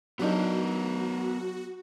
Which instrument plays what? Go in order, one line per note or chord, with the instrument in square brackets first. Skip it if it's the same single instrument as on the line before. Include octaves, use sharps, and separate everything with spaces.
[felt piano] F#3 D4 D#4 [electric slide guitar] B3 A#4 [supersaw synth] F#4